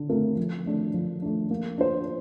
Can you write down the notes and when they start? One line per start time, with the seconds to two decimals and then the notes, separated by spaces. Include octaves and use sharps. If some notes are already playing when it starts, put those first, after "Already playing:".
Already playing: D3
0.09 A3 C4 F4 A#4
0.37 F3
0.66 A3 D4
0.94 F3
1.22 A3 D4
1.50 A#3
1.78 D4 F4 C5